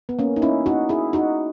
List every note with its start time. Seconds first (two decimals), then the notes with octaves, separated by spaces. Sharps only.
0.09 B3
0.19 A#3 C#4
0.36 D#4
0.42 C#4 E4
0.66 D#4 F#4
0.89 E4 G#4
1.13 D#4 F#4